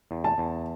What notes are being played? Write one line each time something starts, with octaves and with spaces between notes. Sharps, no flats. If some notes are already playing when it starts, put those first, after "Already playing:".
E2
A5
E2